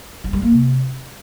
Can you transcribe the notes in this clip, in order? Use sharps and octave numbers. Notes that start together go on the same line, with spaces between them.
F#3
G3
A#3
C3